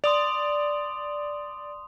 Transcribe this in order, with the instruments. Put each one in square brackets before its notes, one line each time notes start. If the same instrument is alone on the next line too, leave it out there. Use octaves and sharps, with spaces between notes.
[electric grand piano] D5 [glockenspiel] C6 D#6 F7